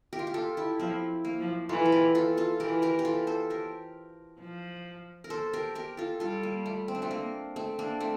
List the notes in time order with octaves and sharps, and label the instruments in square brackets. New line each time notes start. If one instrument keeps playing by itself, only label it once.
[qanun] G4 A#4
F4
G4
F4 A4
E4 G4
[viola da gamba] F3 [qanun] C4 E4
[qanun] A#3
[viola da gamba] F3
[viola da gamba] E3 [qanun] F4 A4
[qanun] A4
G4 A#4
F4 A4
F4 A4
[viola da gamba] E3 [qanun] G4 A#4
[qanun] G4 A#4
G4
F4 A4
A4 C5
G4 A#4
[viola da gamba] F3
[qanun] A#4
A4 C5
G4 A#4
G4 A#4
F4 A4
[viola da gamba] G3 [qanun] F4 A4
[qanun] A#3
A3
C4
D4
A3 C4
A#3
A3 C4
A#3 D4
A3 C4